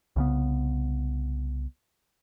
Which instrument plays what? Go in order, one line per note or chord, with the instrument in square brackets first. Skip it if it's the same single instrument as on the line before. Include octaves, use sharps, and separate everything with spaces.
[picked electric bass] C2 C#3 B3